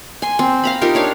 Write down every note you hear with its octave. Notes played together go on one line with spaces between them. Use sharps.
G#5 C6
C4
F5 A#5 B5
D#4 F4 G4 A#4
D4 C#5 F5